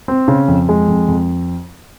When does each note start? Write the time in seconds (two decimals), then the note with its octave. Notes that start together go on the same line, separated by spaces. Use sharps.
0.08 C4
0.28 C#3
0.48 F2
0.69 G#3
0.88 F2
1.08 F2